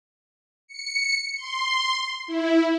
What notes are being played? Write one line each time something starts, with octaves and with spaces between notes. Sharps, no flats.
C#7
C6
E4